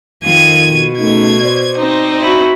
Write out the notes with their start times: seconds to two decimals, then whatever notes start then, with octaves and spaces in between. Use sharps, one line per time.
0.23 F2 D#3 F3 C4 G#6 D#7
0.69 B2
0.98 C#3 A3 D#4 G#6
1.42 C5 D5
1.78 C4 D#4
2.22 E4 F#4